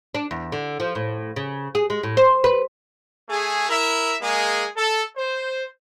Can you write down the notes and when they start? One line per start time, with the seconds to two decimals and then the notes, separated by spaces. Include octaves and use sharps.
0.15 D4
0.31 E2
0.52 D3
0.80 F3
0.95 A2
1.36 C#3
1.75 G#4
1.90 G#3
2.03 A2
2.17 C5
2.44 B4
3.30 A3 G#4
3.70 E4 A#4 E5
4.22 G#3 A#3 G#4
4.77 A4
5.17 C5